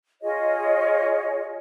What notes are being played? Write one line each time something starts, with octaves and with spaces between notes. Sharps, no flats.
F4 G#4 C#5 D#5